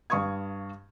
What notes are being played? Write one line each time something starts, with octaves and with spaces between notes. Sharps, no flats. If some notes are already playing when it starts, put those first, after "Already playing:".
G2 F5 C#6 D#6 G#6